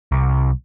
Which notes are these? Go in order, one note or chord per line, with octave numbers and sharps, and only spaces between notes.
C2